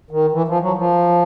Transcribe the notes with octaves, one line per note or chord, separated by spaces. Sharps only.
D#3
E3
F3
F#3
F3